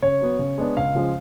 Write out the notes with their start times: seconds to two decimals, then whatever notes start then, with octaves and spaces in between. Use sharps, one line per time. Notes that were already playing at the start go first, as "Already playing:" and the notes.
0.02 C#3 C#5
0.21 F#3 B3
0.39 C#3
0.58 G#3 B3 D4
0.77 C#2 F5
0.95 C#3 F3 G#3